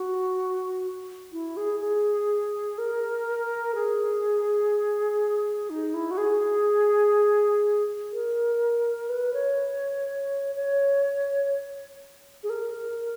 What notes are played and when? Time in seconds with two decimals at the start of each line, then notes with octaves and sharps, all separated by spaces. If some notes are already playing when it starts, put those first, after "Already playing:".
Already playing: F#4
1.32 E4
1.57 G#4
1.80 G#4
2.78 A#4
3.75 G#4
5.70 D#4
5.94 E4
6.11 F#4
6.18 G#4
8.13 A#4
9.09 B4
9.33 C#5
10.55 C#5
12.43 G#4
12.50 A#4